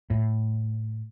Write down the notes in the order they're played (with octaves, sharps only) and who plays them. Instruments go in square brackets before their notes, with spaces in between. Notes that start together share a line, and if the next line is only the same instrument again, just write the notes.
[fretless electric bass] A2